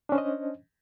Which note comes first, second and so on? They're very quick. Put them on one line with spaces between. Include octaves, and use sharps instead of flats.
D4 C#4 C5 D#5